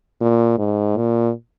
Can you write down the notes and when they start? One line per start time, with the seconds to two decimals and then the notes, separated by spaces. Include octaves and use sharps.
0.21 A#2
0.58 G#2
0.97 A#2